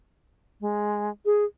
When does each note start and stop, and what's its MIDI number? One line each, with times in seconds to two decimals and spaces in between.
0.61 1.10 56
1.25 1.45 68